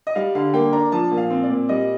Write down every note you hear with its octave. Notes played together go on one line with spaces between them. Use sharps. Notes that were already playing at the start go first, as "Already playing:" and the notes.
D#5
G3 F5
D3 F5
A#3 G5
D4 A#5
F3 A5
A#2
F5
C4
D5
A#2
G3 D#5